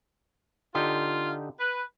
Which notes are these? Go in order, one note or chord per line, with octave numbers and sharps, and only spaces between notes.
D3 D#4 F4 G4
B4